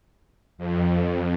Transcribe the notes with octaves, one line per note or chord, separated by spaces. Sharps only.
F2